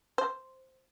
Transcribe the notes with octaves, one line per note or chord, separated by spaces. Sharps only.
C5